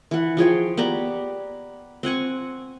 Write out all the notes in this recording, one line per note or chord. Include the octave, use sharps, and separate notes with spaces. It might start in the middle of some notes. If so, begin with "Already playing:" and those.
E3 F#5
F3 G#4 C#5 G5
B3 G4 D5 A#5
C4 F#5 G#5 C#6